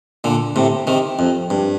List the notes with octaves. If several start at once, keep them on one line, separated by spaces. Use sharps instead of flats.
A#2 D3
A2 C3
C3 D#3
F2
G2